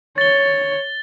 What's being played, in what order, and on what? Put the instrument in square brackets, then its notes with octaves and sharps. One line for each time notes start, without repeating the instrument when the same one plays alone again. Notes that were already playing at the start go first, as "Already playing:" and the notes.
[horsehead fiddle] C#5 [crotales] A6 G7